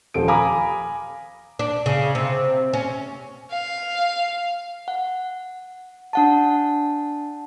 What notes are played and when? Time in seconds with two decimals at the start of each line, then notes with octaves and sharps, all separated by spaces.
0.14 D#1 F3 A4 D7
0.28 F5 G#5 A#5 B5 D6 D#6
1.59 D4
1.86 C#3
2.15 C3
2.74 C#4
3.51 F5
4.88 F#5
6.13 D4 F#5 A5